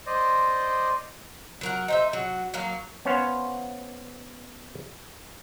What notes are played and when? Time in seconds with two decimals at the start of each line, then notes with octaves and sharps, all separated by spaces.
0.06 C5 D5 D#5
1.61 F#3 A#4 F#5
1.88 D#4 C5 E5
2.13 F#3 F#4
2.54 F#3 A#3 F5
3.05 B3 C#4 C5 C#5 F5